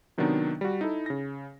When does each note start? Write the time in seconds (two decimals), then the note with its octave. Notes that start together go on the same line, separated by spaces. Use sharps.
0.18 C3 D#3 F#3 B3 D4 D#4
0.61 G3 F#4
0.81 D#4 E4 A4
1.06 C#3 A#6